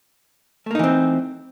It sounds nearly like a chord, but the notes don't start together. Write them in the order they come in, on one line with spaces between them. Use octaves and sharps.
A3 A#3 D#4 E3 C4